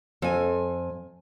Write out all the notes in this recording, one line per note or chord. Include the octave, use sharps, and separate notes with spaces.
F2 G#5